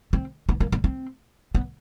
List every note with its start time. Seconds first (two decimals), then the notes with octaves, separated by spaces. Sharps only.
0.13 C4
0.49 B3
0.60 A#3
0.72 B3
0.84 C4
1.55 B3